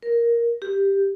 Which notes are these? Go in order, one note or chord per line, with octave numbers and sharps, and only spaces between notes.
A#4
G4